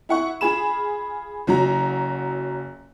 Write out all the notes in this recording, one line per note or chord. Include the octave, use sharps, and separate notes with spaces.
E4 F#5 C#6
F4 G#4 B5 E7
F#1 F#3 A#5